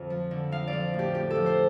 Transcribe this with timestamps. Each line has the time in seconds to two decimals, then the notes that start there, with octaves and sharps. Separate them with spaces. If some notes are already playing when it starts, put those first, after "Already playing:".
Already playing: F2 D3
0.10 F3
0.31 D3
0.52 F3 F5
0.68 D5
0.73 F3
0.94 A2
0.99 G4
1.14 A2 G4
1.30 F3 A4
1.46 C5